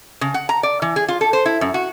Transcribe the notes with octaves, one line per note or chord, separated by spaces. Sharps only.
C#3
F#5
A#5
D5
E3
G#4
F4
A4
C5
E4
F#2
F#4